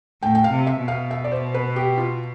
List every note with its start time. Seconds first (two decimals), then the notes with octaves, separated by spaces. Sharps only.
0.22 A2 G5
0.35 G5
0.44 F5
0.51 C3
0.67 E5
0.81 B2
0.88 F5
1.11 E5
1.24 D5
1.32 C5
1.54 B4
1.76 G4
1.98 F4